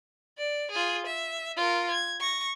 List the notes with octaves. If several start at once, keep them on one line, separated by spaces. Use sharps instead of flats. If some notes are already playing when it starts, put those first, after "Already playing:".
D5
F4 G#4
E5
F4 A#4
G#6
C#6 A#6